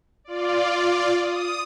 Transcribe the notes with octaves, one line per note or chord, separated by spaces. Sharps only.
F4 D5
D#6